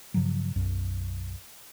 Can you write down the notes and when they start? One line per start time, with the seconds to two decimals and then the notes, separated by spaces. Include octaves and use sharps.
0.14 G2 C#3 F3 F#3
0.56 B1 F#2